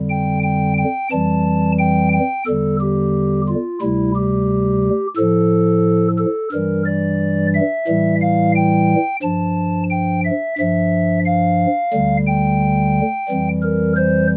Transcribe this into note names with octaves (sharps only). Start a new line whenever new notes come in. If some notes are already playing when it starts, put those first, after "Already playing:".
Already playing: F2 D3 G3
G5
G5
G5
F2 E3 G3 A5
G5
G5
E2 D3 G3 A4
G4
F4
D2 C3 G3 E4
G4
A2 F3 A4
A4
G2 E3 G3 A#4
D5
E5
A2 E3 G3
F5
G5
G2 F3 A5
G5
E5
G2 F3 E5
F5
D2 D3 G3
G5
F2 E3 G3
A#4
C5